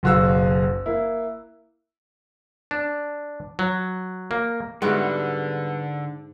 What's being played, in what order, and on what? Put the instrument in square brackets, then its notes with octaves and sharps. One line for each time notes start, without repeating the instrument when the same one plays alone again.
[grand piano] F#1 B1 F#4 F5 E6
A#3 E4
[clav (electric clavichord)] D4
F#3
A#3
[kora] G#2 E4 F#4 [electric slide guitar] D3 [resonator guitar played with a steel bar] G3 B3